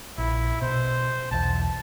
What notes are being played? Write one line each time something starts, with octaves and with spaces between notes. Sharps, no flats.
A#1 E4
B2 C5
B1 E2 A5